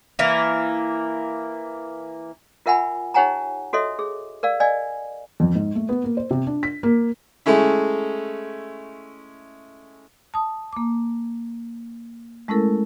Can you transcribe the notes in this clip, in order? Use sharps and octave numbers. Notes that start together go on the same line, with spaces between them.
E3 A#3
F4 A#4 E5 F#5 G#5 B5
D#4 G4 C#5 F#5 G#5 A#5
F#4 A4 C#5 D#5 E5
G#4
A#4 D5 F5
D5 D#5 F5 G#5
F2
G#2
A3
B3
A#3
C5
C3
D4
B6
A#3
G#3 A3 C#4 E4
A5 D#6
A#3 D6
G#3 A3 C#4 E4 A4 A#4